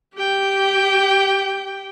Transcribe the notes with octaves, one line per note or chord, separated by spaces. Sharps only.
G4 G5